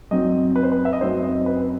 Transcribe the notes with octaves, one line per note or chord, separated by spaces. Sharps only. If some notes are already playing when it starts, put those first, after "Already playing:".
F#2 F#3 C4 D#4 D#5
B4
C5
B4
E5
D#5
F#2 F#3 C4 D#4 C5
D#5
B4